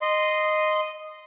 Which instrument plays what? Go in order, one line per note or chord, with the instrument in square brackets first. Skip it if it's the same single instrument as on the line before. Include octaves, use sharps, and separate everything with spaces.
[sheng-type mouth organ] D#5 C6